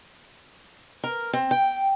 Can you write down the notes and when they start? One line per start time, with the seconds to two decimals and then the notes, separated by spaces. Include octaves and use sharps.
1.03 A#4
1.33 C4
1.51 G5